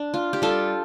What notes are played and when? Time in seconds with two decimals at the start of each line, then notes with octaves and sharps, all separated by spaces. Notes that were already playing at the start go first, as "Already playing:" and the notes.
Already playing: D4
0.14 F4
0.33 G4
0.42 G3 F4 A4